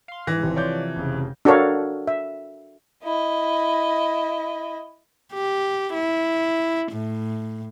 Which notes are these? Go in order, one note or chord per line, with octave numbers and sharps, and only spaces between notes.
F5 C6
G#2 E3 A#6
G#1 C3 F3
C#5 D5 G6
F1 C#3
D4 F#4 A4 A#4 C#5 F5
E5
E4 D#5
G4
E4
A2